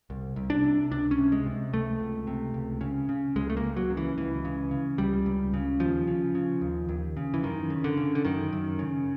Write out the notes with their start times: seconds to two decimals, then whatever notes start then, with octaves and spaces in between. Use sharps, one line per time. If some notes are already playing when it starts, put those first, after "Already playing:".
0.10 C2
0.36 C2
0.50 D4
0.64 C3
0.91 C#2 D4
1.11 C#4
1.18 C3
1.32 G#3
1.46 C3
1.73 C#2 A3
2.00 C#2
2.27 C3
2.54 C#2
2.81 C#3
3.09 C#3
3.36 C#2 G#3
3.50 A3
3.57 A#3
3.64 C#2
3.77 F#3
3.90 C#3
3.97 E3
4.17 C#2 E3
4.45 C#3
4.71 C#3
4.98 C#2 G3
5.26 C#2
5.54 C#3
5.80 D#2 F3
6.07 C#3
6.35 C#3
6.61 D#2
6.89 D#2
7.17 C#3
7.34 E3
7.43 F#2 D#3
7.70 C#3
7.84 D3
7.97 C#3
8.15 D3
8.25 F#2 D#3
8.53 F#2
8.79 C#3